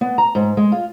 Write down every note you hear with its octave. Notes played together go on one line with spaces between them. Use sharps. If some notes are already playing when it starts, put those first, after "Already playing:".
B3
A#5
G#2
G#3
F4